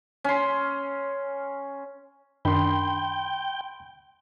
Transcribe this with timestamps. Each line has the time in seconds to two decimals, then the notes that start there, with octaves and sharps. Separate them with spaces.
0.24 C#4 C6
2.45 F#2 D#3 D4 G5 B5 C6